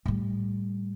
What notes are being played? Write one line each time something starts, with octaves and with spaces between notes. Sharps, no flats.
A2 G3